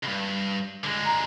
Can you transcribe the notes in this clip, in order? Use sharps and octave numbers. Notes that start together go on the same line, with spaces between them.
C#2 G2
D3 G#3
A#5